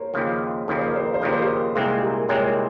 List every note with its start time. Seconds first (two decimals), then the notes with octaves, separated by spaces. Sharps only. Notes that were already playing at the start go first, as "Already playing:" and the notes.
Already playing: A#4 C5 C#5
0.14 D#2 C#3 F3
0.68 D#2 C#3 F3 A#4
0.77 C5
0.87 A#4
0.96 C5
1.05 A#4
1.14 C5
1.22 D#2 C#3 F3 A#4
1.32 C5
1.42 G4 A#4
1.75 C2 A#2 G#3 C4 F4 G#4
2.01 G4 A#4
2.29 C2 A#2 G#3 C4 A#4 C#5